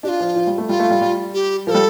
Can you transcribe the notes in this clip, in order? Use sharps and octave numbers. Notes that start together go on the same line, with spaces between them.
D4 G4
F4
F3
F3
G3
A3
G3 F4
A3
G3
G3
G4
F3 A#4
G3 A4